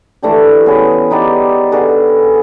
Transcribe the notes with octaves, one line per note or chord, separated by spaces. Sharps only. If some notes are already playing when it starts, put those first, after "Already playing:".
E3 A3 D4 G4
B3 C#4 G#4
B3 D#4 G4 D5
D3 F#4 G#4 B4